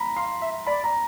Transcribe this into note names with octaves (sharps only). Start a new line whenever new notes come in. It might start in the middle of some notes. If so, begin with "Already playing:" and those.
Already playing: A#5 B5
F5 C6
E5
D5 B5
A#5